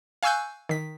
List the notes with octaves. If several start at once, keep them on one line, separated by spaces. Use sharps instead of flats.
F5 G#5 C#6 E6 F#6 G6
D#3 B6